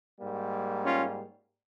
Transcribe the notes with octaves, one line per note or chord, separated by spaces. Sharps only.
G#2 G3 A#3
C#4 F4